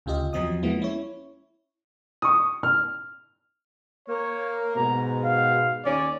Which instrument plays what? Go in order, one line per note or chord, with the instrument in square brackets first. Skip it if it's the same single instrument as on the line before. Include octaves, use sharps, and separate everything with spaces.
[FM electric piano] D2 C#3 F4 G4 D#5 F5
E2 F3 F#3 C4 D#5 D#6
F3 G#3 A#3 B3 E4
C#4 E4 C#5
[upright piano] C#6 D#6
F6
[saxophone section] A#3 [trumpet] C#5
[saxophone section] G#2 B2 [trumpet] A#5
[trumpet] F5
[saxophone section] D#2 C#4 [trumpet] D5